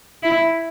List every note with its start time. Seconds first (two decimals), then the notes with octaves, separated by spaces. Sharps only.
0.23 E4